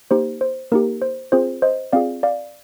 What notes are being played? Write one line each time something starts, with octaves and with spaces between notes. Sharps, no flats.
A#3 D#4 G4 C5
C5
A#3 D#4 G4 A#4
C5
C4 F4 G#4 C5
C5 D#5
C4 F4 G#4 D5 F5
D5 F5